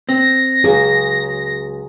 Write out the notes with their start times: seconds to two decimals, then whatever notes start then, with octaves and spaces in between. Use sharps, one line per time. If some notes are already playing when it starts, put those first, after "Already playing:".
0.09 C4 A#6
0.64 C#2 F#3 G#4